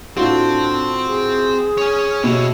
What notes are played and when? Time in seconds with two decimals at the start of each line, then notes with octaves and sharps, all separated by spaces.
0.17 A2 C4 D4 F4 F#4
1.08 G#4
1.78 C#5 G#5
2.24 B2 E4 G4 C#5